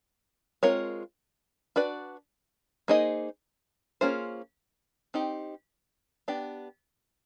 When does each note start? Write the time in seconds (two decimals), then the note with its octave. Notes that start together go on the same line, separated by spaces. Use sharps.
0.63 G#3 C4 F4 A#4 C#5
1.76 D4 F#4 B4 D5
2.88 A#3 D#4 G#4 C5 D#5
4.01 A#3 C#4 F4 G#4 C5
5.14 C4 D#4 G4
6.28 B3 D4 G4